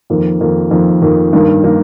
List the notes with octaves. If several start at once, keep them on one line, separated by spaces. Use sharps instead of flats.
F2 D#3 A#3
F2 D#3 A#3
F2 D#3 A#3
F2 D#3 A#3
G2 D#3 A#3
D#3 A#3